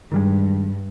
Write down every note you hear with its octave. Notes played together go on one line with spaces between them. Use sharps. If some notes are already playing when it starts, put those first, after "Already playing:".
G2 D#3 G3 G#3